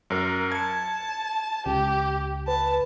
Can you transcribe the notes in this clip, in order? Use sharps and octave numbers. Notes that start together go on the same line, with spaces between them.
F#2 A#4
A5 G#6 C#7
C#2 G4
B4 A5